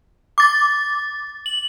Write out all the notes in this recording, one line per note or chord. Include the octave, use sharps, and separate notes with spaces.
D6 A6
F#7